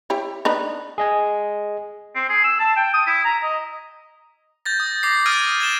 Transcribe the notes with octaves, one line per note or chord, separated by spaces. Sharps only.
E4 G4 C#5
D4 D#4 B4
G#4 D#5 G#5
C4
G#4
E6
A5
G5
D#6
E4
A#5
D#5
G6 A6 A#6
D#6
D6 A#6 C7
D#6 F6 G#6 A6 D7 D#7
G#6 A6 D#7 E7 G7